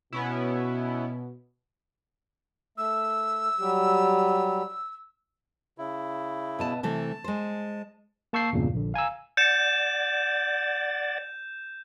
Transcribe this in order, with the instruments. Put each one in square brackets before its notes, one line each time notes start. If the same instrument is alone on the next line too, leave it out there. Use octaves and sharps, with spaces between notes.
[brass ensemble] B2 [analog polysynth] B3 C#4 E4
[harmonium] A3 [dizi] E6
[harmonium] F#3 G3 G4
[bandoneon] C#3 E4
[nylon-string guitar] B2 B3 A5
[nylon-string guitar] C3 E3 A3 [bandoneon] A5
[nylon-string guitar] G#3 C5
[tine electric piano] A#3 A5 C#6 E6 G6 C7
E2 G2 A#2 C#3
A#1 D3
F5 G#5 A#5 E6
[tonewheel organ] D5 F#5 A6 [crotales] G6 E7